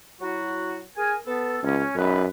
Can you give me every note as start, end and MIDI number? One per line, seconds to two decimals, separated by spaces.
0.20 0.79 54
0.20 0.79 64
0.20 0.79 66
0.96 1.13 68
0.96 1.13 70
0.96 1.13 80
1.25 1.58 59
1.25 1.58 69
1.63 1.83 37
1.63 1.95 61
1.96 2.26 42
1.96 2.21 63
1.96 2.21 71